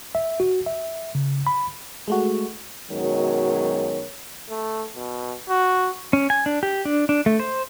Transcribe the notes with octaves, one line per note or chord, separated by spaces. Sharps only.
E5
F#4
E5
C#3
B5
G#3 A3 F#4
F#2 B2 D#3 F#3 G#3 C#5
A3
B2
F#4
C#4
G#5
D4
G4
D4
D4
A3
C5